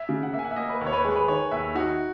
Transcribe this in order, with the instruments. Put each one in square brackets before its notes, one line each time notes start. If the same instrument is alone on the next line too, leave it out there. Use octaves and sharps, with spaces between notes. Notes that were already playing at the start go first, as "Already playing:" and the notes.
Already playing: [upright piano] E5
[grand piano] C#3
[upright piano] F#5
[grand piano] A#3 [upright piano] E5
[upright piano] G#5
F#5
E5
[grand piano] A#3 [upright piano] D#5
[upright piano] B4
[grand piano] D#2
[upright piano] C#5
B4
[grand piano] G#3 [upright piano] G#4
[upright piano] B4
[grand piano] D#3 [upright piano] C#5
[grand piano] D#2 [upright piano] E5
[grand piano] D#4 [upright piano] F#4